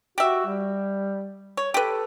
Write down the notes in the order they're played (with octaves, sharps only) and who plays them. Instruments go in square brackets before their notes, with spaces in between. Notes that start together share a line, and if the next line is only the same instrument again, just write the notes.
[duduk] F#4 [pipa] G4 E5
[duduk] G3
[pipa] C#5
[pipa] G4 B4 [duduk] A4